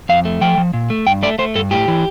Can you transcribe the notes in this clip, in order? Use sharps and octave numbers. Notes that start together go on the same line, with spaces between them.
F2 F5
A3
F3 G5
F3
A#2
A3
G2 G5
A3 D5
A3 C5
G2 A4
A2 G4
E3